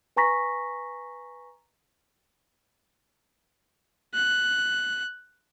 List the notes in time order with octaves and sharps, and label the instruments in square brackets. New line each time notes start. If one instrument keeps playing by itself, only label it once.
[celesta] B4 G#5 A#5 C#6 A#6 B6
[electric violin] F#6